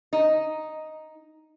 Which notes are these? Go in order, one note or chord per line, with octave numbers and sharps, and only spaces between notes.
D#4